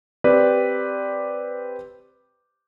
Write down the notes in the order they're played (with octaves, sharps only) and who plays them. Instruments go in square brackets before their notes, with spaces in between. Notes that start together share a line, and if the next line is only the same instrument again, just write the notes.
[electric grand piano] C4 G4 B4 D5